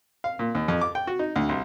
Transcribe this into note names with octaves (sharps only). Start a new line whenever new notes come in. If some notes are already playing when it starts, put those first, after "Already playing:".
F5
A#2
D#2
F2
D6
G5
F#4
D#4
D2
C2